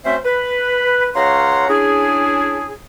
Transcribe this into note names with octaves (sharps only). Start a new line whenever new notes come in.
F#3 A3 C4 C#4 C5 E5
B4
C#2 C#5 F5 F#5 A#5 C6
C#4 D4 E4 G#4